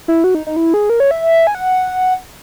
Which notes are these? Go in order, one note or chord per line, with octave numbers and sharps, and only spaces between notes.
E4
F#4
D#4
D#4
E4
G#4
A#4
C#5
E5
G#5
F#5